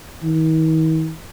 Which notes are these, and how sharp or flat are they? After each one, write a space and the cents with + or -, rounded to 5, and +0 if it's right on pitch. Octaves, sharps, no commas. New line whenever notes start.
D#3 +45